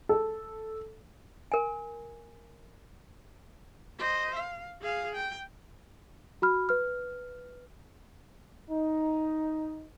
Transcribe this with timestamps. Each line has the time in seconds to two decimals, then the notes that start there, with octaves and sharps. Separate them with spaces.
0.09 A4
1.52 A#4 G#5
3.99 C5 D#5
4.35 F5
4.81 G#4 F5
5.15 G5
6.42 F#4 B5 F6
6.69 B4 F6
8.70 D#4